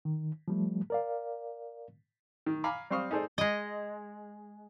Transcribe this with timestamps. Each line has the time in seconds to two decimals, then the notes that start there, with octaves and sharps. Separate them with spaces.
0.05 D#3
0.48 F3 G3 A3
0.90 A#4 D5 F5
2.46 D#3
2.64 F5 G#5 A#5 B5 D6
2.90 G3 C4 C5 F5 C#6 D#6
3.11 D#4 G#4 A4 C5 D5
3.38 G#3 D#5